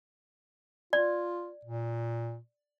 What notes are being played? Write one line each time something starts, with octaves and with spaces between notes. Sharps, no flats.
F4 D5
A#2